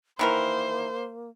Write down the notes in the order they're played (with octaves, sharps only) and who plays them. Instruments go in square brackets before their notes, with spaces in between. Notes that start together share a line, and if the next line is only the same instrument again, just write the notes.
[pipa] D#3 E3 A#4 [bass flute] A#3 [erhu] C5